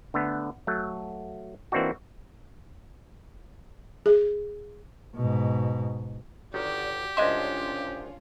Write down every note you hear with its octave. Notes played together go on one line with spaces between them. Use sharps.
D3 A3 B3
F#3 A3
E3 A#3 C4 D4 D#4 F#4
G#4
G#2 B2
G1 D#3 F#4 G4 D5
C2 G#3 C#4 D4 F4 D#5 E5 C6